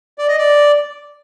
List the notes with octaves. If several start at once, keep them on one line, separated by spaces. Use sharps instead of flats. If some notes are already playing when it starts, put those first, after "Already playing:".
D5
D#5
D5